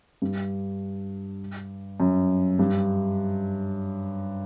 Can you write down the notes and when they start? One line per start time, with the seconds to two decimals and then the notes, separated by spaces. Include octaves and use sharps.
0.22 G2
2.00 F#2
2.59 G2